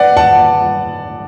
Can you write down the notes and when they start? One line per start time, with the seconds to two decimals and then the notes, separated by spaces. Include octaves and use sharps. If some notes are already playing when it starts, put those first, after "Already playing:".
Already playing: B4 D5 F#5
0.17 F#5 A5